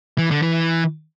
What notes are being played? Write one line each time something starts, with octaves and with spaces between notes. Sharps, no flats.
E3
D3
E3